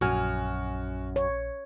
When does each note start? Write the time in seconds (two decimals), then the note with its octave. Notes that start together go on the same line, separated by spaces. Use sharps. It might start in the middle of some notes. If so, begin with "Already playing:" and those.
0.01 A#1 F#2 F#4 G#5 F6
1.16 C#5